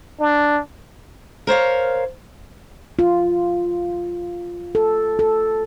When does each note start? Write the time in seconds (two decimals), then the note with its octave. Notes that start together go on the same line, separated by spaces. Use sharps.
0.20 D4
1.47 A#4 C5 C#5 F5
2.99 F4
4.75 A4
5.19 A4